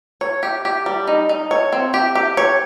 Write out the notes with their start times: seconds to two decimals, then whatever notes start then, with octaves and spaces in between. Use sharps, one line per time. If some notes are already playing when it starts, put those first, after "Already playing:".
0.21 C#5
0.43 G4
0.65 G4
0.86 G3
1.07 D#4
1.29 D#4
1.51 C#5
1.73 C4
1.94 G4
2.15 G4
2.37 C#5